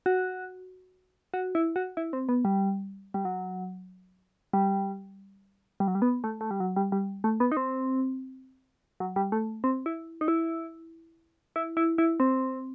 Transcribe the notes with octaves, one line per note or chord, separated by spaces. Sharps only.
F#4
F#4
E4
F#4
E4
C4
B3
G3
G3
F#3
G3
G3
F#3
G3
B3
A3
A3
G3
F#3
G3
G3
A3
B3
D#4
C4
F#3
G3
A3
C4
E4
D#4
E4
E4
E4
E4
C4